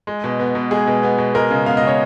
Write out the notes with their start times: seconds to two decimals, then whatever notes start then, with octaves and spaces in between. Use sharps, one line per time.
0.07 G#3
0.24 B2
0.39 B3
0.55 B2
0.71 G#3 G#4
0.87 B2
1.03 B3
1.18 B2
1.34 G#3 A#4
1.50 C#3
1.66 B3 F5
1.77 D#5
1.83 C#3 C#5